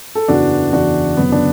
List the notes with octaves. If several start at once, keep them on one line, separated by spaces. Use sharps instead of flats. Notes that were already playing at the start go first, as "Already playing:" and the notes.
A4
F#1 E2 E3 D4 F#4
F#1 E2 E3 D4 F#4
F#1 F#2 D3 F#3 B3
D4